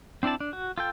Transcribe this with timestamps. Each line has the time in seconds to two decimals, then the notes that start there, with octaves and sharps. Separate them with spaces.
0.23 C4 D4 E4 D5 A5
0.40 D4
0.53 F#4
0.78 F4 A4 G5